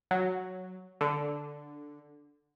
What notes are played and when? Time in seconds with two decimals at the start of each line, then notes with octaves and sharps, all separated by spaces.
0.11 F#3
1.01 D3